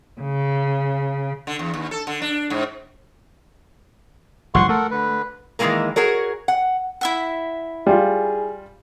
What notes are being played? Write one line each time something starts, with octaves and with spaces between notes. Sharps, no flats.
C#3
D3
E2
D#2
A4
D3
D4
G#2
G1 F3 G3 F#5 C6 C#6
A3 A4 A#4 F#5
D3 B4
D#3 E3 F#3 G#3 A#3 A#4
F#4 G#4 A#4 C#5
F#5
E4 E5 F#5
G3 F4 G#4